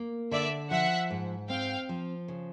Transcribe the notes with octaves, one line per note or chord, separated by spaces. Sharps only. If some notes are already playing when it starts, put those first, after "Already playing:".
Already playing: A#3
D3 D5 E5
F3 E5 F#5
G#2
C4 F5 G5
F3
C#3